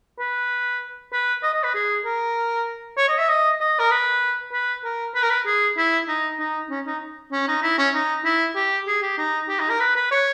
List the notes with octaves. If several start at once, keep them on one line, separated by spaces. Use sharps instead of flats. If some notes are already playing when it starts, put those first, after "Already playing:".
B4
B4
D#5
D#5
B4
G#4
A#4
C#5
D#5
E5
D#5
D#5
A#4
B4
B4
A#4
B4
A#4
B4
G#4
E4
D#4
D#4
C#4
D#4
C#4
D#4
E4
C#4
D#4
E4
G4
G#4
G4
D#4
G4
D#4
A#4
B4
B4
C#5